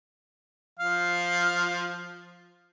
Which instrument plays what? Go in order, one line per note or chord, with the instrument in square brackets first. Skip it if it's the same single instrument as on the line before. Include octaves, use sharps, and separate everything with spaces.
[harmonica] F3 F5